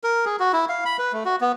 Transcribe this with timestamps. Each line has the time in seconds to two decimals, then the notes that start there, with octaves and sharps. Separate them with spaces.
0.04 A#4
0.25 G#4
0.40 F#4
0.53 E4
0.69 F5
0.85 B5
0.99 B4
1.13 A3
1.25 F#4
1.41 B3